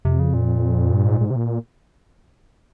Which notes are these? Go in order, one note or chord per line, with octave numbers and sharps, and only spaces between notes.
F2 C3
C#3
A#2
G2
G#2
G#2
C3
A#2